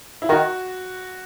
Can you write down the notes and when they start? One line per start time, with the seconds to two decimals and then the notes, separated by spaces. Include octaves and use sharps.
0.22 E4
0.29 D#3 F#4